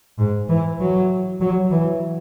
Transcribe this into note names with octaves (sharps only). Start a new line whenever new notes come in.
G#2
E3
F#3
F#3
E3